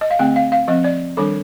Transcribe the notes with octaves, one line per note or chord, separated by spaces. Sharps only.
D#5
F5
D3 A3 C4 G5
F5
F5
F3 C4 D#5
D5
D#3 G3 D4 A4